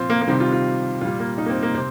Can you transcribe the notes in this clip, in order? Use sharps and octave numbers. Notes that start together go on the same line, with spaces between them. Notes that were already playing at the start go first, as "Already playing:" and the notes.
Already playing: A#2 F3 C4 F4
A#3
A#3
C3 D#3 G3 C4
F4
F4
A#2 G3 F4
A#3
D#4
A#3
C4
A#3
C3 C4